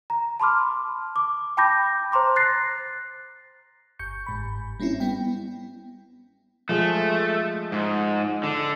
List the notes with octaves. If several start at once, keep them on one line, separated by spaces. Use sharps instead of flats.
A#5
A5 B5 C6 D6 F6
D6
G5 A5 B5 D6 G6 A#6
C5 A#5 C6 D6
F#6 A6 A#6 C7
G1 C#6 G6 C#7
G1 G#2 B5
G3 A#3 C4 C#4 E4
G3 B3 G5
F3 G#3 A3
G#2
D3